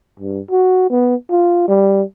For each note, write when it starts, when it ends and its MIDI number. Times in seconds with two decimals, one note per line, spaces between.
0.20 0.40 43
0.51 0.90 66
0.90 1.15 59
1.31 1.64 65
1.68 2.02 55